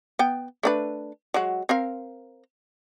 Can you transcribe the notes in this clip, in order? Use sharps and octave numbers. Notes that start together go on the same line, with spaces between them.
B3 G5
A3 D4 B4
F#3 G#3 F#4
C4 A#4 F5